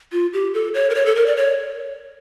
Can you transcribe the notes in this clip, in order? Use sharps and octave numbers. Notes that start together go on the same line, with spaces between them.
F4
G4
A4
C#5
A#4
C#5
A4
A#4
D5
C#5